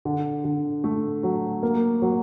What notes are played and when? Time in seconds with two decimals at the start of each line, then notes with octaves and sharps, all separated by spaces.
0.05 D3
0.45 D3
0.84 A3
1.23 F#3
1.63 A#3
2.02 F#3